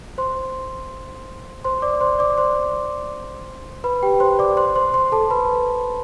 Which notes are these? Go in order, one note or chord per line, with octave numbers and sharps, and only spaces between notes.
C5 C6
C5 C6
D5 D6
C5 C6
D5 D6
C5 C6
B4 B5
G4 G5
C5 C6
D5 D6
C5 C6
C5 C6
C5 C6
A4 A5
B4 B5